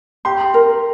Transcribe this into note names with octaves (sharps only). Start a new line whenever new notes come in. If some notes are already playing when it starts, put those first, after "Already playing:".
G4 C6
A#4